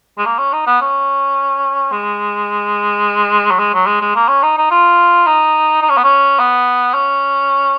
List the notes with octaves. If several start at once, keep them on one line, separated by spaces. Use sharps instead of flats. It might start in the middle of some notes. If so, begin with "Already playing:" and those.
G#3
A#3
C#4
D#4
B3
C#4
G#3
F#3
G#3
F#3
G#3
G#3
A#3
C#4
D#4
D#4
F4
D#4
D#4
C#4
B3
C#4
B3
C#4